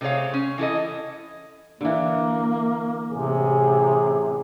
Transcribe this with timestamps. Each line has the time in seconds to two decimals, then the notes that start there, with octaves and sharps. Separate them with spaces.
0.01 C3 A3 C4 G#4 C#5 F5
0.34 C#4
0.58 E3 E4 A4 D#5
1.81 D3 E3 A#3
3.12 A1 C3 G#4